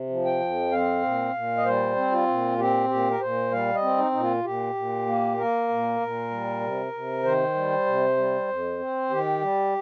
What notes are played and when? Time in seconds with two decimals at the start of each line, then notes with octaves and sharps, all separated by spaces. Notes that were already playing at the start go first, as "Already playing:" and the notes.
Already playing: C3
0.09 F3
0.25 G5
0.40 F2
0.71 C4 F5
1.03 A#2
1.34 A#2
1.57 D#5
1.65 G3 C5
1.96 C4
2.11 F4
2.27 A#2
2.58 C4 G4
2.89 A#2 G4
3.10 A#4
3.20 A#2 C5
3.51 G3 F5
3.75 D#5
3.82 C4
3.98 D#4
4.11 A#2 D#4
4.21 F4
4.44 A#2 G4
4.75 A#2
5.06 A#3
5.37 A#3 A#4
5.69 A#2
6.00 A#2
6.31 G3
6.61 C3
6.93 C3
7.23 D#3 C5
7.54 G3
7.86 C3
8.17 G3
8.48 F2
8.79 C4
9.10 D#3 G4
9.41 G3